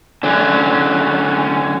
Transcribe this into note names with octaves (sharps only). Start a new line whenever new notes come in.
D3 F#3 C#4